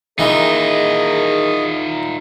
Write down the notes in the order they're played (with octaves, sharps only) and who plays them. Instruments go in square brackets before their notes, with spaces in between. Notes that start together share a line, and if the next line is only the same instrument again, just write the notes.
[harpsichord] D#3 E3 [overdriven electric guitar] D#4 F4 [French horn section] G#4 A#4 [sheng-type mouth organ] D#5